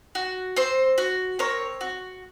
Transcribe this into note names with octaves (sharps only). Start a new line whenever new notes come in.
F#4
C4 C5
F#4
C4 A#4 C#5
F#4